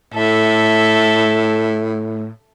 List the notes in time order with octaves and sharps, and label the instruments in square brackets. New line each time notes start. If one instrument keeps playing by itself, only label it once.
[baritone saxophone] A2 [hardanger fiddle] A4 E5